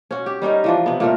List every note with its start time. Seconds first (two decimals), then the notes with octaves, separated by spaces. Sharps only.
0.11 C#4 F#4
0.26 G4
0.42 G3 C#4 D#4 A#4
0.64 E3 F3 D4
0.86 C3 B3
1.00 A#2 A3 A#4